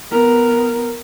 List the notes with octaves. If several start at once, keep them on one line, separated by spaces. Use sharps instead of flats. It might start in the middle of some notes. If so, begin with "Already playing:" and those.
B3 A#4